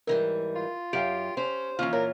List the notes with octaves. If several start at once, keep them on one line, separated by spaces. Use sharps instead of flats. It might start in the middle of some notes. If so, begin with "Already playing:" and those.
G#2 E3 G3 A#4
F4
F#2 G4 F5 G5 D7
C#4 C5
D#2 E3 C#4 F4
A#2 A#4 C#5